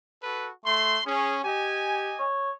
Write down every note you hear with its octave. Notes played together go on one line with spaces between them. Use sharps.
F#4 A4 B4
A3 C6
C#4 G#4
G4 D#5 G#5
C#5